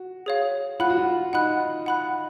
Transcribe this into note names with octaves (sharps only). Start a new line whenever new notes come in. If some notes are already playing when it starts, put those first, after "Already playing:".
Already playing: F#4
G#4 C#5 F5
F4 F#5 B5 F#6
F#4
F4
D#4 F#5 B5 F#6
F#5 B5 F#6